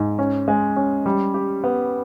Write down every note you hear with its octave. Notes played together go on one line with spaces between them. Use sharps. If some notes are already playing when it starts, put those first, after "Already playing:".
Already playing: G#2
C#4
G#3
C#4
G3
G4
B3